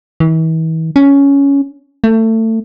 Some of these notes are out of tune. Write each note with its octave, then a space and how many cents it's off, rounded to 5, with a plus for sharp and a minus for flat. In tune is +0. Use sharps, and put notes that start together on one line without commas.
E3 -40
C#4 +10
A3 +25